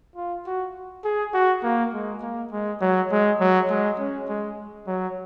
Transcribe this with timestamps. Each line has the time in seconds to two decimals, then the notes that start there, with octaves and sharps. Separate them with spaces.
0.16 F4
0.47 F#4
1.05 G#4
1.34 F#4
1.63 A#3
1.94 G#3
2.22 A#3
2.52 G#3
2.81 F#3
3.12 G#3
3.40 F#3
3.70 G#3
3.99 C#4
4.29 G#3
4.87 F#3